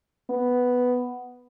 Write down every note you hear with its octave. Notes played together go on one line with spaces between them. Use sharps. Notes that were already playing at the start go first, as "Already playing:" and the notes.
B3